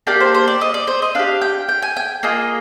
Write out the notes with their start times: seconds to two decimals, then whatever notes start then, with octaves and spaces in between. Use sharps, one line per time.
0.07 A#3 D4 G4 G5
0.20 C5
0.34 C5
0.48 D5
0.61 D#5
0.74 D5
0.87 C5
1.02 D#5
1.15 D4 G4 F5
1.41 G5
1.69 G5
1.82 G#5
1.97 G5
2.23 A#3 F4 G#4 D#5